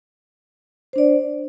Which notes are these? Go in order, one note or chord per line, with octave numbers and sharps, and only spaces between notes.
D4 C5 D5